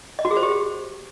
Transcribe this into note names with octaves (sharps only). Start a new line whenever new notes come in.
D#5
F#4
G#4
C5
G4